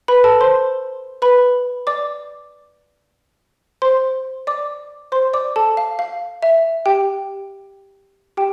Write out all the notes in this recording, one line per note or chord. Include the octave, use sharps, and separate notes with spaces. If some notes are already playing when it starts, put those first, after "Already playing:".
B4 B5
A4 A5
C5 C6
B4 B5
D5 D6
C5 C6
D5 D6
C5 C6
D5 D6
A4 A5
F5
F5
E5
G4 G5
G4 G5